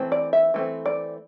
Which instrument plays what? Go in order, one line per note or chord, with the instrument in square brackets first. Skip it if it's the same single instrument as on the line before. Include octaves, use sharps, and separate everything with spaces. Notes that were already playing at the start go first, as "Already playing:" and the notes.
Already playing: [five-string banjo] E3 A3 C4
D5
E5
E3 A3 C4
D5